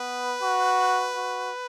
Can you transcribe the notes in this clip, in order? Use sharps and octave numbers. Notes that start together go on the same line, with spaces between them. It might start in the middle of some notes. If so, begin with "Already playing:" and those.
Already playing: B3 B4
F#4
F#4